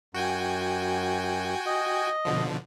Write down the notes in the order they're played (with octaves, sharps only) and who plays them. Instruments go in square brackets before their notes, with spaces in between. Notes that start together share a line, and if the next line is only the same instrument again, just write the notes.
[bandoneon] F#2 [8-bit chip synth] F#4 G5 G#5
[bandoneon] D#5
[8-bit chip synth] B2 D3 F3